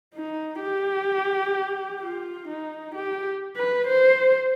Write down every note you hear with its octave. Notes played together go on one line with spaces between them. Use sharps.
D#4
G4
F4
D#4
G4
B4
C5